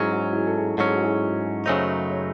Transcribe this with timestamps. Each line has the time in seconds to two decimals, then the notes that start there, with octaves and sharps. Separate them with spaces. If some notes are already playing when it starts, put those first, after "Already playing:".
Already playing: G#2 F#3 C#4 E4 G#4
0.11 F#4
0.33 E4 G#4
0.47 A4
0.56 E4 G#4
0.77 G#2 F#3 C#4 A4
0.86 G#4
0.93 F#4
1.03 E4 G#4
1.66 F#2 C#3 F#3 A3 D#4 G#4 C5
2.11 C#5